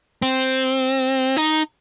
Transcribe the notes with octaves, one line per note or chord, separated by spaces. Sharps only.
C4
D#4